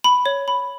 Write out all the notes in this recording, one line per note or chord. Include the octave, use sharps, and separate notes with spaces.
B5
C#5
B5